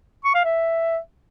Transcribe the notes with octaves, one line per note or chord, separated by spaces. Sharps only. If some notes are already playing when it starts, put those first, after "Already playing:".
C#6
F5
E5